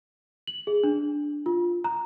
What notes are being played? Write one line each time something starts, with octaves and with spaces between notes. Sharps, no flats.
F#7
G#4
D4
F4
A#5